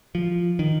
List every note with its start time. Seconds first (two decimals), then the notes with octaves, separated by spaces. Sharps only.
0.15 F3
0.59 D#3